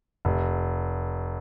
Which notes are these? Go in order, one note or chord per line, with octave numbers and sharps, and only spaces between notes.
F1